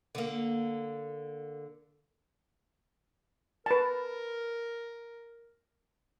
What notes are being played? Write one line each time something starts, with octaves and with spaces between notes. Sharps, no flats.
D3 A#3
A#4 B4 A5